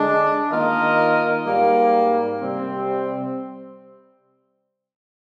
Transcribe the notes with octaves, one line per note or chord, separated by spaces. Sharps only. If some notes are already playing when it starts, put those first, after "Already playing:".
Already playing: D3 G#3 D4
D#3 A#3 F4 A#4 D#5
G#2 G3 A#3
C3 G3 C4